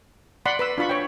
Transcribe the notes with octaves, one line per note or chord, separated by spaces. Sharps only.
D5 F#5 B5 C6
B4 B5 E6
D4 F4 B5 C#6
C#5 G5